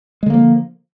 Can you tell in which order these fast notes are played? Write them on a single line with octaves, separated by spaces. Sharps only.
G#3 D3 A#3 F3